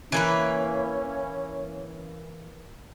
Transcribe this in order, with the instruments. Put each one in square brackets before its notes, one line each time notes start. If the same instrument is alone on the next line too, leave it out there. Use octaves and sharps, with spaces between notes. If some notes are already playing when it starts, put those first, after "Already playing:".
[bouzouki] E3 A#3 B4 [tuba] C#4